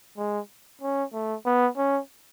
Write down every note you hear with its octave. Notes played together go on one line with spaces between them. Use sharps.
G#3
C#4
A3
B3
C#4